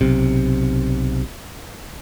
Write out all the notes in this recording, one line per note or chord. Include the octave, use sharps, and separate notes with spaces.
B1 C3